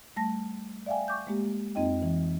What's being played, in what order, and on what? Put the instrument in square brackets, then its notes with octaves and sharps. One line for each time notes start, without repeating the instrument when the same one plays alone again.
[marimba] G3 A3 A5 A#6
D5 E5 F5 G5 G#5
C#6 D6 G6
G#3 A#3 G4
F2 C4 D#4 D#5 G5
E3